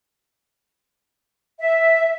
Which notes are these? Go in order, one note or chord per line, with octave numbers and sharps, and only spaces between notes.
E5